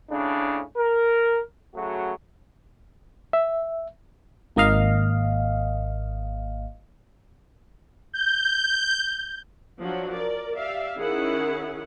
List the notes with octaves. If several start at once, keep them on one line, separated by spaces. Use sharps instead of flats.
A2 C#3 D4
A#4
C#3 F#3 A3 F#4
E5
G#1 A#3 D#5 F5
G6
F3 F#3 D4 F#4
A#4 D5
G4 D5 E5 F5
D#3 C#4 E4 G#4 F#5